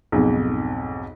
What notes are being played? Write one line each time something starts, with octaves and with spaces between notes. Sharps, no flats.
B1 F2 G#2